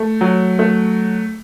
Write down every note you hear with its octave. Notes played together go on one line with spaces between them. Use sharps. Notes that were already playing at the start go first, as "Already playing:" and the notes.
Already playing: A3
F#3
A3